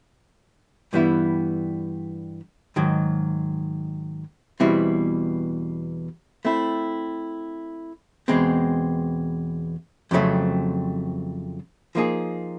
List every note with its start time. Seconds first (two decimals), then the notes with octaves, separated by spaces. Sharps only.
0.93 G2 E3 G3 B3 E4
2.76 G#2 D#3 F#3
4.60 E2 B2 G3 C4 E4
6.45 A3 C4 E4
8.28 E2 B2 G#3 C4
10.11 F2 C#3 F#3 A3 C4
11.95 F3 A#3 D#4 G#4